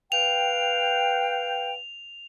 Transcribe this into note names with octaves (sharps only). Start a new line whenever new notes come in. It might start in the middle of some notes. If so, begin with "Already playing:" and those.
B4 F5 G5 F7